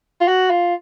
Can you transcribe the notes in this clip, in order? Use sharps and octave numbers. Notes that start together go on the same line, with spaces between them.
F4
F#4
F4